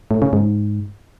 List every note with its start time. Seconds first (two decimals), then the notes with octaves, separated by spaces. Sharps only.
0.11 A2
0.22 C#3
0.33 G#2